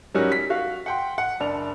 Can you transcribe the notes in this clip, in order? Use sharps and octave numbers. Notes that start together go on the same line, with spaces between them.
F#3 G3 C#4 D#4 F#4 A#4
B6
F#4 F5
F#5 G5 C6
F#5
F#1 D4 F7